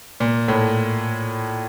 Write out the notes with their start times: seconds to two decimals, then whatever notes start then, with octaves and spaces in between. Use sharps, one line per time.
0.20 A#2
0.48 A2